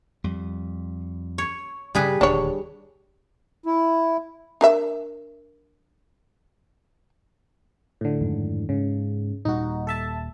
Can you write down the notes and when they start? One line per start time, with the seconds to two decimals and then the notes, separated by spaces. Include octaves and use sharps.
0.24 F2 G3
1.38 C#5
1.95 G2 C#3 G3 G#4 B4
2.21 D#1 D2 G2 D4 C#5
3.66 E4
4.61 D4 A#4 E5
8.01 A2 D3
8.20 F2 G#2 D#3
8.69 G#2 C#3
9.45 D#1 A#2 G3 D#4 F#4
9.87 A4 E5 A5